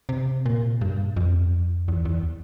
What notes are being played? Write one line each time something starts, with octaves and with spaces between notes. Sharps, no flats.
C3
A#2
G2
F2
E2
E2